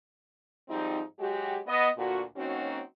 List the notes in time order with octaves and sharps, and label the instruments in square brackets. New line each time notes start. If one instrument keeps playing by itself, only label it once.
[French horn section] G#2 F3 G3 C4 D#4
F#3 G#3 F#4 G4
B3 D#5
D2 A#2 F#4
F#3 A#3 C4 C#4 D#4 F#4